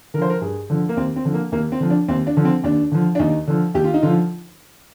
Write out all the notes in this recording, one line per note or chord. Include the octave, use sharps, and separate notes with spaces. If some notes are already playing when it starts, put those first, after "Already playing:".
D3 F3 A#4 C5
A#4
G2 G#4
D3 F3
A#3
D#2 C4
C4
D3 F3
A#3
D#2 A#3
C4
D3 F3
D4
D#2 C4
D4
D3 F3
C4
D#2 D4
D3 F3
D4
D#2 D#4
D3 F3
D#2 G4
F4
D#4
D3 F3 F4